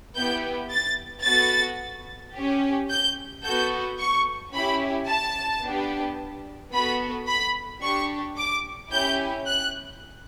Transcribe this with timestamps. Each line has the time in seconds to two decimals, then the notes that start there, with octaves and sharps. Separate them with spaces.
0.16 B3 E4 G4 G6
0.72 A6
1.26 B3 F#4 A4 A6
2.36 C#4 G4
2.90 G6
3.45 B3 F#4 A4 G6
4.00 C#6
4.54 C#4 E4 G4 B5
5.09 A5
5.64 B3 D4 G4
6.73 B3 F#4 A4 B5
7.28 B5
7.83 D4 G4 C#6
8.38 D6
8.92 C#4 E4 G4 G6
9.47 F#6